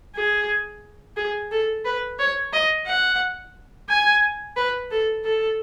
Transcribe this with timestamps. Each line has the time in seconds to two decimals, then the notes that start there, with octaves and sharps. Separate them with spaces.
0.15 G#4
1.17 G#4
1.51 A4
1.85 B4
2.19 C#5
2.53 D#5
2.87 F#5
3.89 G#5
4.57 B4
4.91 A4
5.25 A4